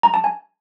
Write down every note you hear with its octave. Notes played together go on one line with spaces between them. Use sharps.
A#5
A5
G#5